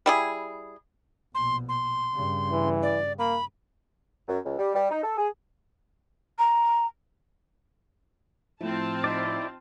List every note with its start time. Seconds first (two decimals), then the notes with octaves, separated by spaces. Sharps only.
0.06 G3 E4 G#4
1.35 A#1 B2 C6
1.69 C6
2.13 G2 C#3
2.51 E3
2.83 D5
3.19 A#3 B5
4.28 F#2
4.45 C#2
4.59 G3
4.75 G3
4.91 D#4
5.03 A4
5.18 G#4
6.38 A#5
8.61 A2 F3 C4 E4 F4 A5
9.04 D#4 E4 G4 D5